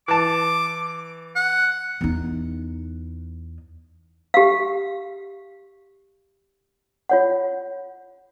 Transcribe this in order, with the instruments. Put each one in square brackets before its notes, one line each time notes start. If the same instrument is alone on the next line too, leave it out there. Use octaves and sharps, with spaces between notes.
[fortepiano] E3 A5 [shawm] D6
[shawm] F#5
[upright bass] E2 D#4
[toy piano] G4 F5
F4 C#5 F#5